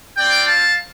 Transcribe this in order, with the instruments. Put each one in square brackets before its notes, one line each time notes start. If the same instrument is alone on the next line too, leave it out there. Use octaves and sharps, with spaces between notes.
[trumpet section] C4 F4 D5 G5
F5 A5